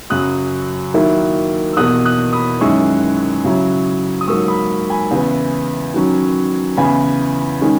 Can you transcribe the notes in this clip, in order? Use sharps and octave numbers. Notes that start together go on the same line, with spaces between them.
F#2 C#3 F#3 D#6 F#6
D#3 F#3 A#3 E4
E6
E2 B2 A#3 D#6 F#6
D#6 F#6
B5 D#6
F#2 D#3 G#3 C#4 E4 C#6 E6
C#3 F#3 C#4 E4
D#6
G#2 F#3 A#3 C#6 E6
B5 D#6
G#5 B5
E2 C#3 E3 B3
D#3 F#3 C#4
E2 C#3 E3 B3 G#5 B5
D#3 G#3 C#4